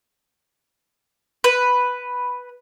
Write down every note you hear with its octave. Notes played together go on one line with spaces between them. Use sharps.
B4